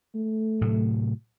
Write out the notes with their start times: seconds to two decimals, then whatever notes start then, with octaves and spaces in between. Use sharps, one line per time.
0.15 A3
0.61 A2 C3 F#3